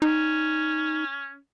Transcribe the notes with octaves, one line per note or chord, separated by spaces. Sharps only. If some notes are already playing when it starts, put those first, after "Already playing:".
C#4 D#4